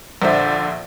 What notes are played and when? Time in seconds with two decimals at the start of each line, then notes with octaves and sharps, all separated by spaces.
0.22 A#1 D3 C5 E5